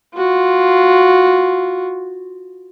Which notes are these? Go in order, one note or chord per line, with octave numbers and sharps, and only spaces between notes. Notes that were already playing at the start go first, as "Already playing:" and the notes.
F4 F#4